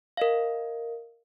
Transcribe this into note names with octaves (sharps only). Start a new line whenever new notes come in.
A#4 D#5 F5